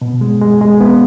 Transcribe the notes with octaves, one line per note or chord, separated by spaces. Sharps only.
B2
G#3
G#3
G#3
B3